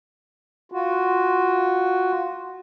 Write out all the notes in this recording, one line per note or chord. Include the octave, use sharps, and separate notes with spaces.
F4 F#4